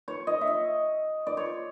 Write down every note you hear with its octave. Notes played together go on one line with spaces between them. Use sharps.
C#5
D#5
E5
D#5
D5
C#5